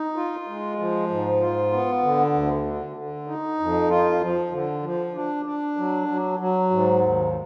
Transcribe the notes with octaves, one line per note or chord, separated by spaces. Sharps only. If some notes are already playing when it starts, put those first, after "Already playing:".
Already playing: D#4
F4
G#3
F3
G#2
F4
B3
D3
D2
D3
D3
D#4
F2
F4
F3
D3
F3
D4
D4
F#3
F#3
F#3
G#2
D#2